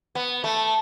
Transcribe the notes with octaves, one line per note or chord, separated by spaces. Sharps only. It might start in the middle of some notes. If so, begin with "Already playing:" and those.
B3
A3